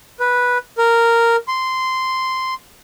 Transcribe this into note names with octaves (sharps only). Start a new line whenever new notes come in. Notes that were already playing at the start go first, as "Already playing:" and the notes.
B4
A#4
C6